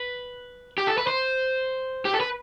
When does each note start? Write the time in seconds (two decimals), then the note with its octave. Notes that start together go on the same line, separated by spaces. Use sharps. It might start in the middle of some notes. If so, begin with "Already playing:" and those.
Already playing: B4
0.78 G4
0.87 A4
0.98 B4
1.07 C5
2.05 G4
2.14 A4
2.20 B4